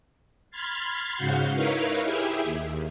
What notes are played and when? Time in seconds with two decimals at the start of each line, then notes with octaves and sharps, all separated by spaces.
0.51 B5 C6 F6 G#6 A6 C7
1.16 G#2 C#3 F#4 F5 F#5 G6
1.54 D#4 E4 A#4 B4 C#5 F5
2.03 E4 G4 G#4 E5
2.44 D#2